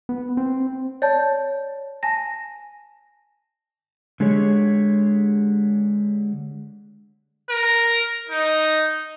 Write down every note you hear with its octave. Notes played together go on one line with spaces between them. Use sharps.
B3
C4
C#5 D5 A5 G6
G#5 A5 A#6
D3 G#3 G4 G#4 C#5
A#4
D#4